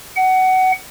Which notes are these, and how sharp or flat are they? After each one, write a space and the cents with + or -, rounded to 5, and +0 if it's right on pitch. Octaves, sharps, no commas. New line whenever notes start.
F#5 +20